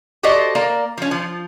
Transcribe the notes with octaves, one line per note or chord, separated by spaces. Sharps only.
F#4 G4 A4 C5 D5 D#5
A#3 A#4 D5
F3 C#4
F3